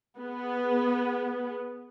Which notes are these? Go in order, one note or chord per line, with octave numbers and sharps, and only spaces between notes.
B3 G#4